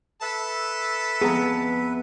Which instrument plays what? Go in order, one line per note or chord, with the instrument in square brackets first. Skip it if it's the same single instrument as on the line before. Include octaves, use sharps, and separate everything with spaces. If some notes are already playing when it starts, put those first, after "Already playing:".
[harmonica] A4 A5 [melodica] B4 E5
[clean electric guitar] F2 B3 [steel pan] G#4 A#5